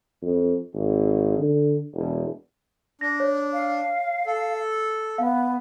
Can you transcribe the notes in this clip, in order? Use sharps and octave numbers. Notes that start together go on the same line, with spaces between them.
F2
G#1
D3
E1
D4 A#6
C#5
F5
A4
B3 F5